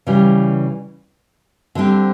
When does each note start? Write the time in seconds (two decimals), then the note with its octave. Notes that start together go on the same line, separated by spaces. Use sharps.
0.07 C#3 E3 G3
1.75 D3 G3 C4